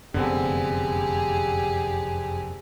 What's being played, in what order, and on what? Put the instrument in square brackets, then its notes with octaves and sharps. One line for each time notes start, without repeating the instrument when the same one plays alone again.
[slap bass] F1 F#2 [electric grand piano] D3 B3 C4 [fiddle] G4 G#4